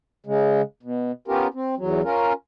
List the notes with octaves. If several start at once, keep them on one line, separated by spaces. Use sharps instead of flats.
C#3 G#3
B2
B3 C#4 F4 G4 A#4
C4
E2 F#3
C#4 F4 A#4